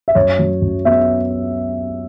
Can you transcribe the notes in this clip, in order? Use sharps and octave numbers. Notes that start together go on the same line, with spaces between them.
E5
F#2 C#5
F#3
F#2
B3 E5